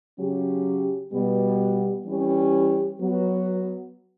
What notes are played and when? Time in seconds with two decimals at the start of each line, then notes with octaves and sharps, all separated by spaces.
0.18 C#3 F#3 C#4 G4
1.12 B2 G3 B3
2.06 E3 G3 C#4 G4
3.00 F#3 B3 F#4